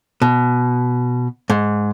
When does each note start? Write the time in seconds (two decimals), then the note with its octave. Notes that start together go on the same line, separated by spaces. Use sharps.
0.22 B2
1.50 G#2